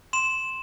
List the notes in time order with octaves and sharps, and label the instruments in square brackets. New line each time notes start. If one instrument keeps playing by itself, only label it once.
[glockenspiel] C6 E7